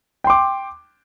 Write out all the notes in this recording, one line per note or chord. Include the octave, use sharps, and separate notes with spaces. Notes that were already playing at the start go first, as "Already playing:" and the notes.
G5 C6 D6